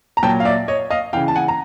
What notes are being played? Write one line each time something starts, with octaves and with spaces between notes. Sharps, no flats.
A#5
A#2 F#3 G5 A5
F5
D5 E5
C#5 D#5
D#5 F5
C#3 E3 F5 G5
A5
F#5 G#5
A#5